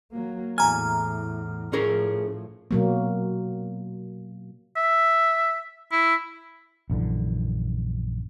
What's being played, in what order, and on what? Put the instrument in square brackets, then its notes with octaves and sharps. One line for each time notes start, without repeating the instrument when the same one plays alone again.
[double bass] F#3 A#3
[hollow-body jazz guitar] E2 G#5 [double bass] A2 [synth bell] A#5 F6
[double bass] A2 F3 [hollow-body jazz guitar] C#4 G#4 A#4
[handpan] B2 F#3 A#3
[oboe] E5
E4
[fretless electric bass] A#1 F#2 D3 E3